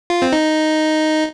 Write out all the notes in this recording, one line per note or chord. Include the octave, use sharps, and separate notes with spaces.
F4
C4
D#4